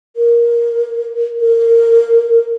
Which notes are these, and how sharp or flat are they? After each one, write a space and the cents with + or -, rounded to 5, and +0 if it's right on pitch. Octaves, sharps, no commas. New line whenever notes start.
A#4 +15
A#4 -15